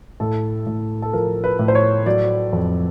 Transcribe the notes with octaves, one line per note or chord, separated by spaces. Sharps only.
A2 A4
A2
A4
F3 A#4
B4
A2
C5
C#5
F#3 D5
F2